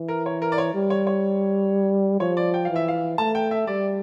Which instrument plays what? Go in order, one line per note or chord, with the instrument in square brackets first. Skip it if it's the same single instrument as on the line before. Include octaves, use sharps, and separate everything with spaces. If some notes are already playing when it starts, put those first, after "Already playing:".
Already playing: [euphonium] E3
[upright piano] A#4
C#5
A#4
D5
C#5
[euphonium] G3
[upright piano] C#5
C#5
[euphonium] F3 [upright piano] C#5
[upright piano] D5
G5
[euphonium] E3 [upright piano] F5
[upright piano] E5
F5
[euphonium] A3 [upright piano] A5
[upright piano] G5
E5
[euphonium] G3 [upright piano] D5